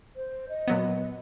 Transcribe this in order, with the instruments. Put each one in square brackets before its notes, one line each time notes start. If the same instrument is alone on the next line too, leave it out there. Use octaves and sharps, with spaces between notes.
[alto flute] C5
D#5
[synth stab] A#2 F#3 B3